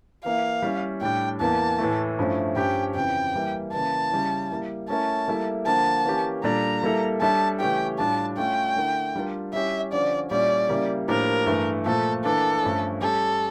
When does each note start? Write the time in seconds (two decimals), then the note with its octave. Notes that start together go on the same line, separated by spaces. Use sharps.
0.24 E3 A#3 E4 F5
0.62 G3 C#4 E4
1.01 A2 G3 D4 G5
1.40 E2 E3 A#3 A5
1.79 A2 E3 A3
2.18 G2 F3 A3 C#4 E4
2.56 G2 F3 C#4 G4 G5
2.95 F2 C#3 E3 G5
3.34 E3 G3 A#3 E4
3.73 C#3 E3 A#3 E4 A5
4.11 C#3 G3 C#4 E4
4.51 G3 A#3 E4
4.89 A3 C#4 E4 A#4 E5 A5
5.28 G3 A#3 E4 A4 E5
5.66 D3 F3 A#3 A5
6.05 E3 A#3 C#4 G4
6.44 A#2 G3 D4 A4 D5 A#5
6.83 G3 A#3 E4 A4
7.21 G3 D4 A4 C#5 E5 A5
7.60 C#3 E3 A3 C#4 G4 G5
7.98 A2 G3 D4 F4 A5
8.37 A3 C#4 F4 G5
8.76 D3 A3 E4 A#4
9.15 G3 D4 F4 A#4
9.53 G3 C#4 E4 G4 C#5 E5
9.92 D3 F3 C#4 D5
10.31 A#2 G3 C#4 E4 D5
10.69 C#3 G3 A#3 E4 G4
11.08 A2 F3 A#3 D4 G4 A#4
11.46 G2 E3 A3
11.86 A#2 F3 A3 A4
12.24 E3 A#3 D4 A4
12.63 G2 F3 A3 C#4
13.01 G3 C#4 G4 A4 C#5